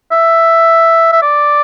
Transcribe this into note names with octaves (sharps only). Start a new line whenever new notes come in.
E5
E5
D5